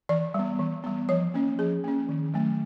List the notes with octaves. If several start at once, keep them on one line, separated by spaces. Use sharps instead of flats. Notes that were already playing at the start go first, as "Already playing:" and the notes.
E3 D5
G3 B3
E3
G3 B3
F3 C#5
A#3 C#4
F3 G#4
A#3 C#4
D#3
F#3 A3